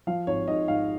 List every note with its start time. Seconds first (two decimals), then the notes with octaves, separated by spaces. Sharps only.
0.07 F3 F5
0.27 G#1 C#5
0.48 G#2 D#5
0.68 G#2 F5